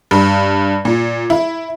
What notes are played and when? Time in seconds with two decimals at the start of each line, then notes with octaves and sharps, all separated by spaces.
0.11 G2
0.85 A#2
1.30 E4